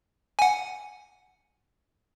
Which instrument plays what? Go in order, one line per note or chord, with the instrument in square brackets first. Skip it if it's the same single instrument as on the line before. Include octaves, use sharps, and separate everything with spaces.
[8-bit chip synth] F#5 G#5